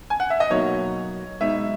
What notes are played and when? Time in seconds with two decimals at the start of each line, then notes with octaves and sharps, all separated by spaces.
0.10 G#5
0.20 F#5
0.30 E5
0.40 D#5
0.50 B2 F#3 A#3 D#4 C#5
1.40 B1 B2 G#3 D#4 E5